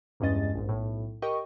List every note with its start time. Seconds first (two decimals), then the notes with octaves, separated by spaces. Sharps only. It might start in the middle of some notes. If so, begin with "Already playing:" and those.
0.20 E2 G2 G#3 C#4 D#5 A6
0.54 A#1 G#2
0.69 B1 A2
1.22 G4 A#4 D#5 G5 C#6